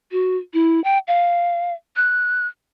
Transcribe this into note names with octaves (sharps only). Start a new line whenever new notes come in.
F#4
E4
G5
F5
F#6